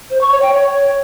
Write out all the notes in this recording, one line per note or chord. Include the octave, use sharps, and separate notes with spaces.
C5
C#6
C#5
G5
C#5